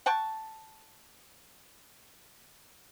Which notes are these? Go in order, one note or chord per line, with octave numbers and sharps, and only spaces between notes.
F#5 G5 A5 C#6